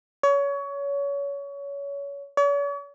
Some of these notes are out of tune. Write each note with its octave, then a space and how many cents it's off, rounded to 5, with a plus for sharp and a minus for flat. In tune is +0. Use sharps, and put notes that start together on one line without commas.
C#5 +25
C#5 +45